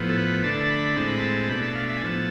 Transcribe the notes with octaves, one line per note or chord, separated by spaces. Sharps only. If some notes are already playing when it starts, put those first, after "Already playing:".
Already playing: A2 F3 B3
A4
B4
D3 A3 D4 A5
A5
B5
A2 G#3 C4 A5
B5
A5
A5
B2 A3 D4 B5
A5
F5
E5
G#5
A2 F3 B3 A5